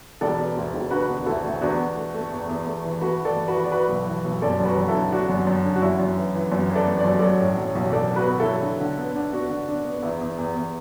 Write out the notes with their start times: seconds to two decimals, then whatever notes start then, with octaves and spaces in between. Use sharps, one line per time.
0.21 E1 A4 D5
0.39 B3
0.56 D2
0.74 E1
0.91 D3 F#4 B4
1.09 B3
1.26 D2 E4 A4
1.44 D2
1.61 E2 D4 F#4
1.78 E2
1.96 A3
2.14 A3
2.31 E2
2.49 E2
2.67 A3
2.84 E3
3.01 A3 F#4 B4
3.19 E3
3.25 A4 D5
3.36 A3
3.48 F#4 B4
3.54 E3
3.64 D5
3.71 E3 F#4 B4
3.89 B1
4.07 E3
4.24 B1
4.42 F#2 A4 D5
4.60 F#2
4.65 F#4 B4
4.77 F#2
4.88 E4 A4
4.94 D3
5.11 D3 D4 F#4
5.29 F#2
5.47 F#2
5.64 D3
5.76 F#4
5.82 F#2 E4
5.99 F#2
6.17 E3
6.35 E3
6.52 F#2
6.70 E3
6.75 A4 D5
6.87 A3
6.99 D5
7.04 F#2
7.19 F#3 A4 D5
7.40 A2
7.57 F#3
7.75 B1
7.92 B1 A4 D5
8.10 B3
8.16 F#4 B4
8.28 B3
8.40 E4 A4
8.45 F#3
8.62 D3
8.80 D3
8.98 B3
9.15 D4
9.33 B3 D4 F#4
9.50 D3
9.68 D4
9.85 B3
10.03 E2 E4
10.21 E2
10.38 E2
10.55 E2